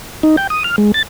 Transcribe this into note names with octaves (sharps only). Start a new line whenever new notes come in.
D#4
G5
D#6
F6
G#3
A6